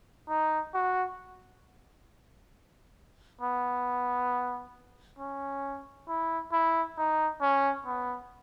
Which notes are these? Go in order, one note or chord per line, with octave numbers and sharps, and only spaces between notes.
D#4
F#4
B3
C#4
E4
E4
D#4
C#4
B3